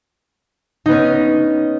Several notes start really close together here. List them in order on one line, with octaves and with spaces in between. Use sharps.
D#4 B3 C#4